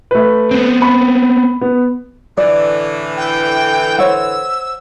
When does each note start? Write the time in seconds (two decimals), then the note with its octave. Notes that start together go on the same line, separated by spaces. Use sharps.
0.11 A3 B4
0.51 B3 C4
0.82 B5
1.61 B3
2.38 A2 D3 E3 D5
3.17 G5
3.99 C5 C#5 F#5 E6